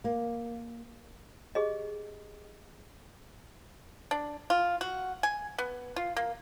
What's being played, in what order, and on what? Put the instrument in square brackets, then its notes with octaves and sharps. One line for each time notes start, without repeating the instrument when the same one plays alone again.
[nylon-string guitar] A#3
[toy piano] G4 G#4 D#5
[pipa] D4
F4
F#4
G#5
B3
F4
A#3